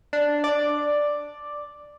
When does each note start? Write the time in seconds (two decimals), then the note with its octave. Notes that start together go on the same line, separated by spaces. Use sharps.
0.13 D4
0.44 D5